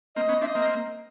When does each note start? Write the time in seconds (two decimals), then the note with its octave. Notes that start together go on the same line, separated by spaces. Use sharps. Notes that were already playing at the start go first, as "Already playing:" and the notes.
0.16 A#3 C4 D#5
0.29 B3 C#4
0.41 C4 D4 E5
0.45 D#5
0.55 A#3 C4